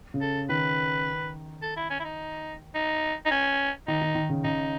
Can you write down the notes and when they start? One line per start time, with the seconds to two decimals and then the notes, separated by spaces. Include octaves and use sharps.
0.14 C#3
0.21 A4
0.49 D#3 B4
1.62 A4
1.76 E4
1.90 C#4
2.00 E4
2.04 D#4
2.75 D#4
3.26 D#4
3.31 C#4
3.88 D#3 D#4
4.02 D#3
4.15 D#3
4.30 C#3
4.44 C#3 D#4